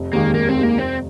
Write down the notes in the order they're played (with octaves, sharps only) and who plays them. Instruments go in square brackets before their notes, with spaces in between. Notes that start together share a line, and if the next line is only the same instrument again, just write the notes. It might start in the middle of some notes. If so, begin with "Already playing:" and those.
Already playing: [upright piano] F1
[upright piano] D#2 D#3 G#3 [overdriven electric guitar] A#3
[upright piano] F1 [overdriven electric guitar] A#3
[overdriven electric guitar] C4
[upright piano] D#2 D#3 G#3
[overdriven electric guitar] A#3
[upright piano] F1 [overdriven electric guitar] C4